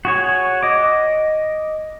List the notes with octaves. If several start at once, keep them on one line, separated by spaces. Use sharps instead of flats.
F#4 G#4 C#5
D#5 D6